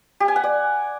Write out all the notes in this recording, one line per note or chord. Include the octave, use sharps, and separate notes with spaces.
G4
G#5
F#5
D5